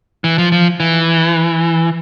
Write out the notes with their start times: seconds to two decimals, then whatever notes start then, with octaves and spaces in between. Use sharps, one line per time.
0.24 E3
0.38 F3
0.52 F3
0.80 E3